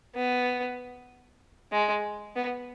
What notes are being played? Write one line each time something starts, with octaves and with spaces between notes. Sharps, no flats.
B3
G#3
B3